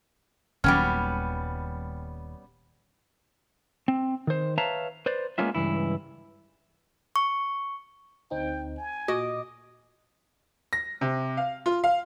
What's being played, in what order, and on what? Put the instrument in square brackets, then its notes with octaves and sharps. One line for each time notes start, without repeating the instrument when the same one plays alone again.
[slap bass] D#1 D#2 F#3 [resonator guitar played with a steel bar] G3 B3 C#4 [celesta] G5 F6
[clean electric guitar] C4
D#3 C5
B4 C#5 E5 F5 A5 A#5
B4 C5 D5
G#3 A#3 B3 C#4 F4 E5
C#2 G2 E3 E4
[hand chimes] C#6
[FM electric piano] D2 C4 D#4 [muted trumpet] G5
[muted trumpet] G#5
[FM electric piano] A#2 D6 [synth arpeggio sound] F#4 [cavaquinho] D#5
[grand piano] A#6
C3
F5
F4
F5